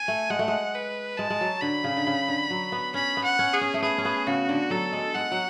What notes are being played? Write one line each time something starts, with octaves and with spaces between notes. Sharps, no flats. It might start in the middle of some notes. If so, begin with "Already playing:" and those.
Already playing: G#5
A3
G#3 F#5
A3
G#3
B4
G#3 A5
G#3
F#3
D3 B5
C#3
D3
C#3
D3
F#3
B3
C#4 B5
B3
F#5
C#4
G#4
C#4
A3
B3 G#4
C#4
B3
C#3 F#4
D3
F#3 A4
G#3
G#3 F#5
F#3